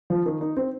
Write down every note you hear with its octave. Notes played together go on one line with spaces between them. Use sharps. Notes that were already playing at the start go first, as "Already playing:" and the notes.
F3
D#3
D#4
C4